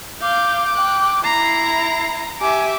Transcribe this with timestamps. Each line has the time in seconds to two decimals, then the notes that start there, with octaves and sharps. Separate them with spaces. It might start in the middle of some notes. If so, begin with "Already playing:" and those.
0.22 F5 D6 G6
0.77 G5 F#6
1.24 E4 A#5 C7
2.41 G4 E5 G#5 D6